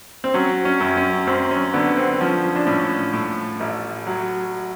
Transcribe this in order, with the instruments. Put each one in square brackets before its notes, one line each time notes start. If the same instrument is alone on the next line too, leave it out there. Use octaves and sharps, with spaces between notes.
[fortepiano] C4
F#3 C#4
C#4
F#2
C#4
F#2 C4
C#4
D3 B3
C4
F3 C#4
D4
A2 C#4
A2
A1
F#3